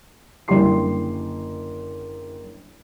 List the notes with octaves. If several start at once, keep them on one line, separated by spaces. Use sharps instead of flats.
F#1 D3 E4 G4 C6 C7